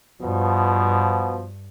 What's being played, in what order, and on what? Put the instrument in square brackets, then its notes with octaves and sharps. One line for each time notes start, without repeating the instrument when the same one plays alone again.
[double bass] G2 [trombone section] B2 F3